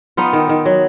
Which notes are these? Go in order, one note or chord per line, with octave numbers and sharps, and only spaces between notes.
B3 D#4 F4
D#3
D#3
F#3